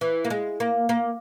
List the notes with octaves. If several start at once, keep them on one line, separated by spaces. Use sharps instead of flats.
E3
A#3
G#3
A#3
A#3